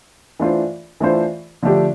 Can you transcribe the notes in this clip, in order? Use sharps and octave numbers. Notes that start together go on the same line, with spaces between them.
E3 A3 D4 F4 C5
E3 A3 D4 F4 C5
D3 F3 A3 D4 G4